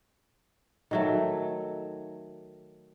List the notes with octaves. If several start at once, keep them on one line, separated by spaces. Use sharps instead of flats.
D#3 F#3 A3